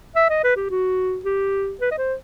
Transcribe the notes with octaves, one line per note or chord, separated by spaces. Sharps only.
E5
D#5
B4
G4
F#4
G4
B4
D#5
C5